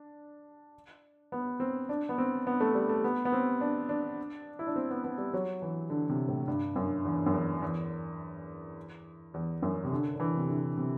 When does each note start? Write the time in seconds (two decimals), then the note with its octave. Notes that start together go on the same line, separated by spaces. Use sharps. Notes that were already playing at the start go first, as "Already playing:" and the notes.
Already playing: D4
1.32 B3
1.60 C4
1.89 D4
2.09 B3
2.18 C4
2.47 B3
2.60 A3
2.75 G3
2.89 A3
3.04 B3
3.25 B3
3.32 C4
3.61 D4
3.89 D4
4.59 E4
4.67 D4
4.76 C4
4.91 B3
5.04 B3
5.18 G3
5.34 F#3
5.62 E3
5.90 D3
6.09 C3
6.28 A2
6.48 G2
6.76 F#2
7.05 E2
7.26 F#2
7.33 E2
7.62 E2
9.34 E2
9.62 F#2
9.84 C3
9.92 D3
10.16 D3
10.20 E3
10.37 C3
10.48 D3
10.77 C3